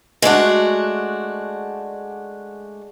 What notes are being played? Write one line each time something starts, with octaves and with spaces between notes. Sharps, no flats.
G#3 A3 D4 F#4